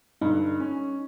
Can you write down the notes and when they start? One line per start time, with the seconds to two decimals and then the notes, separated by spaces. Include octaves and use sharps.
0.21 G2 D3 D#4
0.60 C#4